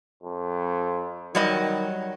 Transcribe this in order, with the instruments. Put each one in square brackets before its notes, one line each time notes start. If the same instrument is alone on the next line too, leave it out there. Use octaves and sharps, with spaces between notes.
[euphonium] F2
[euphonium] D#3 [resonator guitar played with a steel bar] F#3 G3 D#5